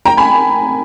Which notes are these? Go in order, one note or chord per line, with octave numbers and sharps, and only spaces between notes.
G5 A#5
G#5 B5